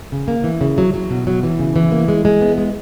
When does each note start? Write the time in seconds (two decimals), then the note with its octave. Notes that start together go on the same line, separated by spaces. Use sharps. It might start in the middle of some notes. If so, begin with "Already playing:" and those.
0.12 C#3
0.28 A#3
0.44 E3
0.61 C#3
0.78 F#3
0.94 F#3
1.10 B2
1.27 F#3
1.43 E3
1.59 C#3
1.76 E3
1.92 A#3
2.08 G#3
2.25 G#3
2.41 B3
2.58 G#3